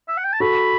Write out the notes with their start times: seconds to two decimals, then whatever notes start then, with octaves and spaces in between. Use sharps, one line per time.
0.09 E5
0.17 F#5
0.24 G5
0.33 A5
0.40 F#4 A4 B5